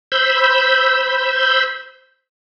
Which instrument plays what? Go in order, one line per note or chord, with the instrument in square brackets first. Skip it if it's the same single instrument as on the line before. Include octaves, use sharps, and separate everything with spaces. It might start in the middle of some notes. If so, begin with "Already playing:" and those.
[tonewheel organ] C5 B5 E6 G6